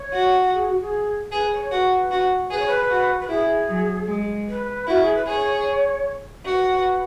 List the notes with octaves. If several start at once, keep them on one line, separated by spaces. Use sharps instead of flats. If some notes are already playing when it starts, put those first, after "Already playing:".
Already playing: C#5
F#4
G#4
F#4
G#4
G#4 B4
C#5
F#4 B4
F#4
G#4 B4
C#5
B4
F#4
B4
E4 G#4
F#3
G#3
B4
E4 F#4
G#4
B4
G#4 C#5
F#4 B4